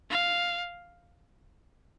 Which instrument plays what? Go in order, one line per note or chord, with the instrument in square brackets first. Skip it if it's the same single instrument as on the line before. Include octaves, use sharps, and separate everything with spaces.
[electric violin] F5